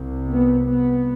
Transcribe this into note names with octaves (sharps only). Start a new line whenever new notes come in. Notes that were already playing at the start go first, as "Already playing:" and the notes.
Already playing: C2 C3
B3
B3